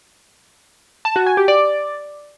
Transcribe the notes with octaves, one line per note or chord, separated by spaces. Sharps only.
A5
F#4
G#5
G4
D5